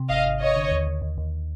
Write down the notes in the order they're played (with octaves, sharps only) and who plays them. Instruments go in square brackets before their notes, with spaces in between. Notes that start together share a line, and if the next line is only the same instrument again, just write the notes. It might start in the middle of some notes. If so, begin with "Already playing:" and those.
Already playing: [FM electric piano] C3
[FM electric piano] G#1 [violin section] D#5 F5
[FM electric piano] G#1
[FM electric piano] G#1 [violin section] C#5 D#5
[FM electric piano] D3
D#2
D#2
D#2
D#2